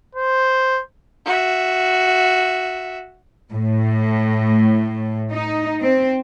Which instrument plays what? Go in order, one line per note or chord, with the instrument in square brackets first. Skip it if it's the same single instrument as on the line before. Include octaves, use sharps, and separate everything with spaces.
[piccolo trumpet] C5
[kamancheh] F#4 E5
[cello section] A2
D#4
C4